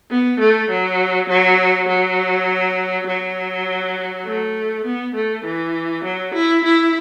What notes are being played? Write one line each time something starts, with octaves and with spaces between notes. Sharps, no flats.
B3
A3
F#3
F#3
F#3
F#3
A3
B3
A3
E3
F#3
E4
E4